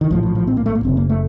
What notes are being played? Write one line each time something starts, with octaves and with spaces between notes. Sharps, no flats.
D#3
A#1 A2 F3
F3
F3
C4
A#3
A3
A#3
F#1 F#2 C#3 C4
A#3
A3